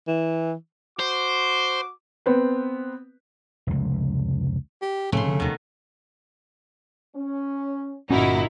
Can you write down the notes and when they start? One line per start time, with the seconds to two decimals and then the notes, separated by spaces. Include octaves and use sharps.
0.07 E3
1.00 F#4 C5 D6
2.26 B3 C4 B4
3.67 F1 C#2
4.82 G4
5.12 F1 A2 C#3 A3 C6
5.26 D3
5.40 D#2 B2 D#3
7.14 C#4
8.10 G1 A#2 C#4 D#4 E4 F#4